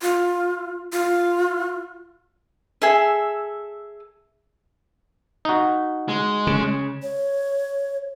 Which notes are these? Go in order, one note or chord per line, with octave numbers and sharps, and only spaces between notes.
F4
F4
G#4 A4 E5
D#4 F#4
G#3
C#3
C#5